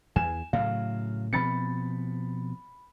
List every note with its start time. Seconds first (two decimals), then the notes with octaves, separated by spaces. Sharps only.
0.16 E2 G#5 E7
0.53 A2 C#3 F#3 F5
1.33 B2 F3 C4 B5 A6 C#7